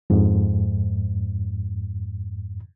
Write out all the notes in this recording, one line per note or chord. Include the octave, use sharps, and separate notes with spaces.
F2 G#2